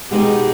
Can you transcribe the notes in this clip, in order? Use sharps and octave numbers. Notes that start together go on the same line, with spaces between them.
B2 G#3 B3 D#4 G4 G#4